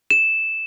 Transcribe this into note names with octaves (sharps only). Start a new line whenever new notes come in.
E7